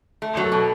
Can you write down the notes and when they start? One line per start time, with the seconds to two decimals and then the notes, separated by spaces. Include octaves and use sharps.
0.22 A3
0.37 F#3
0.44 A4
0.52 B2